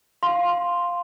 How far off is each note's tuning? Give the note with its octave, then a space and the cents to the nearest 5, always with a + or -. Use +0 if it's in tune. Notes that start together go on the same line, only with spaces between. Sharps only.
F5 +5 C6 +0